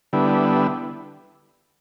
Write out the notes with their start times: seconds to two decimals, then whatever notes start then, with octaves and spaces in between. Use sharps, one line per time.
0.13 D3 G3 B3 E4